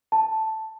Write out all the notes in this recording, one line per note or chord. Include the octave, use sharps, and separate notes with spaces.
A5